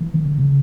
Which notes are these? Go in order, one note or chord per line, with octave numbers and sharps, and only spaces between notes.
E3
D#3
D3
C#3